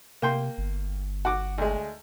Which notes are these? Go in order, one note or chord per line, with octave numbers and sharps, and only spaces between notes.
C3 A#3 G5 C6
G1
F#4 D6
D2 G#3